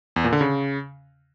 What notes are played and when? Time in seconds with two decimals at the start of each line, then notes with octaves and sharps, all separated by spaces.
0.16 E2
0.24 A#2
0.33 D3
0.41 C#3